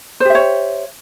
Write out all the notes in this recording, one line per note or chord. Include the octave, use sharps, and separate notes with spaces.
G4 C5 C#5 E5